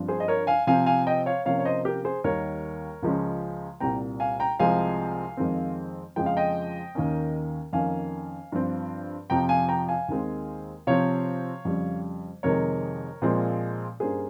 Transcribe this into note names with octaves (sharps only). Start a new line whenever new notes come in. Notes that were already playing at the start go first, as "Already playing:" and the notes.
Already playing: G2 F3 C4
G#4 C5
D#5
A#4 C#5
F5 G#5
C3 F3 C4 F5 G#5
F5 G#5
D#5 G5
C#5 F5
C3 F3 A#3 C#4 C#5 F5
C#5
C5 D#5
G4 A#4
G#4 C5
D#2 D#3 G3 A#4 C#5
C#2 C#3 F3 G#3 C#4
C2 A#2 G3 C4 G5 A#5
F5 G#5
G5 A#5
C2 C3 F3 G#3 C4 F5 G#5
F2 D#3 G#3 C4
F2 C#3 F3 G#3 G5
F5
D#5 G5
D#2 D#3 A#3 C#4
F2 D#3 A#3 C#4 F5 G#5
G2 F3 C4
F2 C3 F3 G5 A#5
F5 G#5
G5 A#5
F5 G#5
D#2 D#3 G#3 C4
C3 F3 C4 C#5 F5
F2 C#3 G3
F2 C3 D#3 G#3 A#4 C#5
A#2 F3 G#3 C4
G2 G3 A#3 C#4 G#4 C5